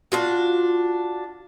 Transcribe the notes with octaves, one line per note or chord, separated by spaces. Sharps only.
D4 F4 F#4